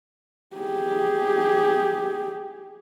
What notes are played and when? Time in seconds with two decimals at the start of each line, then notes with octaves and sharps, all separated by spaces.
0.56 G4 G#4